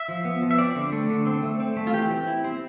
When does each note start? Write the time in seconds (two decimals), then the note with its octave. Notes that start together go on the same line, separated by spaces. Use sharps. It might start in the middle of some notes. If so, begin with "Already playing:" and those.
Already playing: E5
0.09 F3
0.25 B3
0.42 F3
0.51 E5
0.58 C4 D5
0.76 D3
0.92 A3
1.10 D3
1.26 C4
1.43 A3
1.60 C4
1.77 A3
1.87 F4
1.93 E3 G4
2.11 C4
2.27 E4
2.44 C4